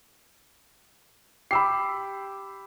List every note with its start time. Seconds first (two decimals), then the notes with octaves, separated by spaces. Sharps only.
1.51 G4 B5 E6 C7